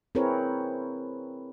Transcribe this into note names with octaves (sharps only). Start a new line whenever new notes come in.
C4 E4 G#4 A#4 B4 C#5